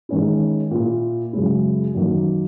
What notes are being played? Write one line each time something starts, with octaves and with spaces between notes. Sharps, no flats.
D#3 G#3 C#4 E4
A#2 A#3 E4
F#2 C#3 G#3 C#4 E4
F#2 D#3 A#3